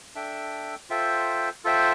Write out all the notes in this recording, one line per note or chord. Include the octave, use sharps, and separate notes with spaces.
D4 A4 E5 G5
F4 A4 C5 E5 G5
F4 A4 C5 E5 G5